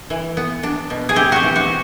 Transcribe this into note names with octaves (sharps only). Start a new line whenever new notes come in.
E3
B3
D4
B2
G#4
C4 G4
F#4 G4
E3
F#4